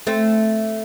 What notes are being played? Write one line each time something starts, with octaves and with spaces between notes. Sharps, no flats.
A3 C4